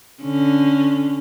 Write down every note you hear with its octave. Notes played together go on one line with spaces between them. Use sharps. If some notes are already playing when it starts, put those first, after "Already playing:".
D3 C#4